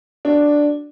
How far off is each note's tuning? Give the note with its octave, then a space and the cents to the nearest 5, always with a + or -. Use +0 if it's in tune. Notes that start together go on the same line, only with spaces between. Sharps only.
D4 +0 F#4 +10